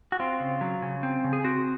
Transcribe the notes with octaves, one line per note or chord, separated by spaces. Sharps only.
F#4
C4 F4
C#3
F#3
C#3
C4
C#3
G#4
C4 F#4